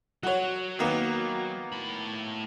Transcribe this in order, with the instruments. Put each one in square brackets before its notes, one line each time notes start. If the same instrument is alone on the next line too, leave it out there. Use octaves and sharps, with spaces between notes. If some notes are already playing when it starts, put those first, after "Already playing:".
[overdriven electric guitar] F#3 [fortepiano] F#4 C#5
[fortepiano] D#3 A#3 B3
[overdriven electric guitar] A2 B5